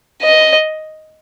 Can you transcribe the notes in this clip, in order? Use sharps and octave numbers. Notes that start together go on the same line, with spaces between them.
D#5